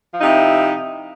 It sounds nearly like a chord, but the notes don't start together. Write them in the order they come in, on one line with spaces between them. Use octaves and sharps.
F3 D#4 C3 E4